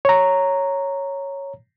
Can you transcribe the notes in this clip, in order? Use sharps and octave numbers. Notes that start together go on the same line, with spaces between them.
C#5 A#5